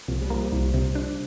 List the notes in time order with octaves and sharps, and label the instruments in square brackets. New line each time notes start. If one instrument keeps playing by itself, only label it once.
[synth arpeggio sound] C2 [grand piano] F3
[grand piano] G3
[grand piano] F3 [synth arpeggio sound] A#3
[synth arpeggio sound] C2
C3
D4